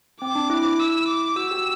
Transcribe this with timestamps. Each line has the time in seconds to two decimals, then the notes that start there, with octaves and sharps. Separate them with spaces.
0.21 C4 D6
0.35 D4
0.50 E4
0.80 E6
1.08 D6
1.36 F#4 E6
1.51 G4
1.58 F#4